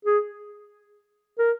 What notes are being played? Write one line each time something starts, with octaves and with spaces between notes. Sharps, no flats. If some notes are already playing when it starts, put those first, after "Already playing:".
G#4
A#4